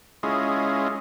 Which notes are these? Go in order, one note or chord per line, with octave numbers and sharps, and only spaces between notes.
G#3 C#4 E4 F4 G#4 D#5